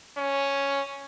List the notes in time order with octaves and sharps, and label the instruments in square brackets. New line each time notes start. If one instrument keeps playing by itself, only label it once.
[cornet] C#4